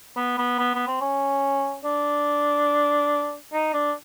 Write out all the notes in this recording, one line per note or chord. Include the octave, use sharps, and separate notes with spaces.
B3
B3
B3
B3
C4
C#4
D4
D#4
D4